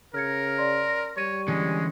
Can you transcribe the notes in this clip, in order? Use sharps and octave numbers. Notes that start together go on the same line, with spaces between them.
C#3 A#4 F6 G#6 C#7
D5 C6
G3 C#5 C#6 D#7
D3 E3 G#3 C#4